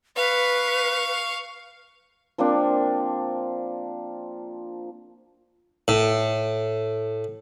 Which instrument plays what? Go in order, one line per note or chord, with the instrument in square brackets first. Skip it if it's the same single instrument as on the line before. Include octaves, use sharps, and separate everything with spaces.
[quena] B4 [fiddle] F5 C#6
[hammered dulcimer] F3 A#3 C4 D4
[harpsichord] A2